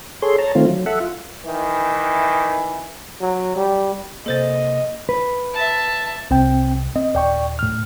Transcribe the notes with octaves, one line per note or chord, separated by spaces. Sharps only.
G#4 A4 C#5 C6
C#5 A5 A#5
D#3 A3 C4 F4
F#3
A4 E5 F#5
F4
D#3 E3
F#3
G3
C3 A#3 A4 C5 D#5 A6
B4
E5 A5
C2 C4 G5
C4 D#5
D#1 D5 G5 C#6
A2 F6